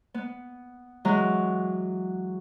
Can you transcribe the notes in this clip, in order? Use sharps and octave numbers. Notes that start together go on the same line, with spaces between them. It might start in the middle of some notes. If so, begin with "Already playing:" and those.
B3
E3 F#3 G#3 F#5 A#5